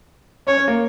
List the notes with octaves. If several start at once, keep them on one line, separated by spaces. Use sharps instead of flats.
C#4 C#5
C#4
A#3